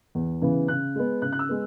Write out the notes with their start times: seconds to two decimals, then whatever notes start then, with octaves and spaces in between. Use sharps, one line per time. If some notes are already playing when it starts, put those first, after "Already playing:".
0.15 E2
0.41 C#3 E3 B3
0.68 C#3 F#6
0.96 G#3 B3
1.22 C#3 F#6
1.32 F#6
1.39 E6
1.49 G#3 B3